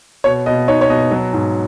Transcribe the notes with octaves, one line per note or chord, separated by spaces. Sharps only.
B2 C#5
B2 D#5
D#4 C#5
C#5
B2 D#5
F#3
G#2